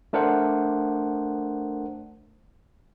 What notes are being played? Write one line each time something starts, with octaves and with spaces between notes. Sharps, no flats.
A3 D4 A#4 C5 F#5